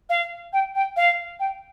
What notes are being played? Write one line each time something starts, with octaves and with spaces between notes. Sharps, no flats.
F5
G5
G5
F5
G5